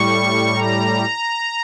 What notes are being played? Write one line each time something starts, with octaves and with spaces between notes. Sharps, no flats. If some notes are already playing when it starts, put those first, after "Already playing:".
Already playing: A2 G3 C#6
A#5